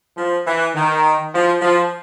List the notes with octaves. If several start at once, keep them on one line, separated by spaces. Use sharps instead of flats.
F3
E3
D#3
F3
F3